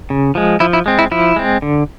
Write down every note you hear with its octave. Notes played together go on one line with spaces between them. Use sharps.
C#3
F3 G#3
F3 E4
E4
G#3 C4
E4
F3 E4
G#3 C4
D3